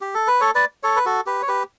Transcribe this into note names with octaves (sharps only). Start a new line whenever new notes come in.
G4
A4
B4
A4 C#5
B4 D5
A4 C#5
B4
F#4 A4
G4 B4
C#5
G4 B4